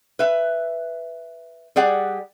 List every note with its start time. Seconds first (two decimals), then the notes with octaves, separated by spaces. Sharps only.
0.19 B4 E5
1.76 G3 G#4 D5 F#5